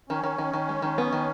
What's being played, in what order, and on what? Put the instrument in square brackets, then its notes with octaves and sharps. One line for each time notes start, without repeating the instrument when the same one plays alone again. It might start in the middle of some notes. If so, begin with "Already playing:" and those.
[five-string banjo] D#3 [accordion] C#4
[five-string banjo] D#3
D#3
D#3
G#3
D#3
B3
D#3